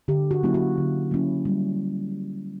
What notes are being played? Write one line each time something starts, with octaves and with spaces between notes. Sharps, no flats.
D3 G4
F#4
F#3 A#3 C#4 E4
F#4
D3
F#3 A#3 C#4 E4
G3